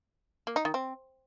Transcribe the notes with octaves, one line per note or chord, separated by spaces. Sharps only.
A#3
D#4
D#3
C4